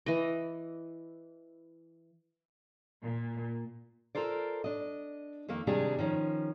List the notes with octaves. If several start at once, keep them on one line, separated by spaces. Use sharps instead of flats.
E3 D#5
A#2
F4 A4 A#4 C5 D5
D4 D#5
F2 D#3 A#3
C3 D#3 G3 G#3 D4 G#4
D#3 F3 C#4